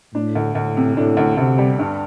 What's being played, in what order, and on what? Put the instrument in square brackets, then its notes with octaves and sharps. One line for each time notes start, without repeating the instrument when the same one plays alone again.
[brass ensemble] A2 [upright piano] D4
[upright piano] D2
[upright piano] D2 [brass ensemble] A2
[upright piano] C3
[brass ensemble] A2 [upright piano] D4
[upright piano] D2
[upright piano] D2 [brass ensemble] C3
[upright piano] G3
G2